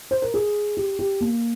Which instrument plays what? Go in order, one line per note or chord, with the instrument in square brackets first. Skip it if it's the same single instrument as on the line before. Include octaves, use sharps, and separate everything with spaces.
[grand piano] C5
A#4
G#4
G4
G4
A#3